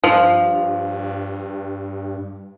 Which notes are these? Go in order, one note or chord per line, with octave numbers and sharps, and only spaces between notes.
G2 F3